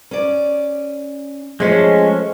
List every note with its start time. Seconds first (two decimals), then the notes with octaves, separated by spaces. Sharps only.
0.11 C#4 D5
1.60 F3 G#3 A3 C#4 C5